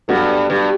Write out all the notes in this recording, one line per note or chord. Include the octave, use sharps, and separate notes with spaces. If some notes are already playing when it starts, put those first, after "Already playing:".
G2 F#3 B3 F#4 A4
G2